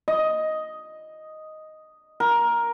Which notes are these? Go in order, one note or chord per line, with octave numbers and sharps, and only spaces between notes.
D#5
A#4